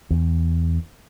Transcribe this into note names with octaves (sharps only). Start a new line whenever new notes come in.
E2